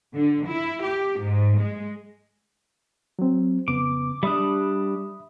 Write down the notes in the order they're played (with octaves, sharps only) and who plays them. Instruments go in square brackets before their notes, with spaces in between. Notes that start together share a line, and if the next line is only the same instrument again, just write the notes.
[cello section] D3
E4
G4
G#2
G#3
[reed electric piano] F#3 C4
[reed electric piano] F2 C#3 B3 [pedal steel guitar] D6
[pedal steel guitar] G3 D4 [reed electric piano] E5 B5 D#6